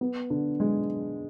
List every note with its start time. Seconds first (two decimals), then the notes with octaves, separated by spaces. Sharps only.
0.01 B3
0.30 D3
0.60 G#3